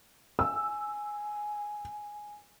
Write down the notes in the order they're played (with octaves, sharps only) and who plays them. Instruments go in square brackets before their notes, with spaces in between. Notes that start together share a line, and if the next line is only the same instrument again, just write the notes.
[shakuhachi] G#5 [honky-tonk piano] E6